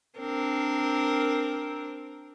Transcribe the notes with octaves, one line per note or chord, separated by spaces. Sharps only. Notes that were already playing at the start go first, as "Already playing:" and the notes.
C4 D4 A#4